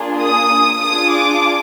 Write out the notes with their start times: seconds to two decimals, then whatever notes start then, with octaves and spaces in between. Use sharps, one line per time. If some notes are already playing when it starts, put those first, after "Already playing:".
Already playing: A#3 D4 F4 G#4
0.22 D#6
0.81 D4 F4 G#4 D#6
1.12 D6